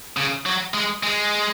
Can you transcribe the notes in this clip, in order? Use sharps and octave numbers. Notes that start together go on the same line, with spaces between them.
C#3
F#3
G#3
G#3